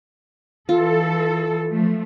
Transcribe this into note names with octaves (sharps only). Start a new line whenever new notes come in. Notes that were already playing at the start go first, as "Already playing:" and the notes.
E3 F4 A4
F3 A3